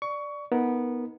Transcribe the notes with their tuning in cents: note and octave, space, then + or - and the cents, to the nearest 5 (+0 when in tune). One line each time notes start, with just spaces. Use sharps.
D5 +0 C#6 +20
B3 -10 D#4 +15 A#4 +0